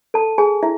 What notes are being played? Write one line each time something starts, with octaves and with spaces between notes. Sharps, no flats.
A4 A5
G#4 G#5
E4 E5